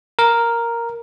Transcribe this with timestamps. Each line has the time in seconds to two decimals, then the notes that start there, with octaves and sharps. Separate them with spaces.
0.19 A#4